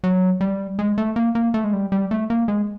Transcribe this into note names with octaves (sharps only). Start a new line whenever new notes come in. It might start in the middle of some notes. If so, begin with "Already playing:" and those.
F#3
G3
G#3
A3
A#3
A#3
A3
G#3
G3
G3
A3
A#3
G#3